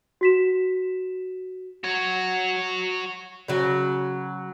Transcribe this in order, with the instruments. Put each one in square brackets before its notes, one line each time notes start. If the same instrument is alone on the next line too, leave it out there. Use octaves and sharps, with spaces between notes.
[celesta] F#4 B6 E7
[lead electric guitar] F#4 C#5
[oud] C#3 F#3